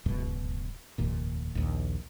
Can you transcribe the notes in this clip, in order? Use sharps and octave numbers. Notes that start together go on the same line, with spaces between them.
D1 C#2 F#2 B2
F1 D#2 A#2
A#1 D#2